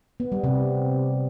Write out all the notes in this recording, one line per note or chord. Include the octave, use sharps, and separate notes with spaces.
B3
G3
C3